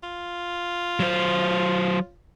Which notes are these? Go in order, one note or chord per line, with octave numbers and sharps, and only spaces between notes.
F4
F#3 C5